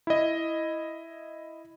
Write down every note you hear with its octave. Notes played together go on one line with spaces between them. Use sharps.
E4 D#5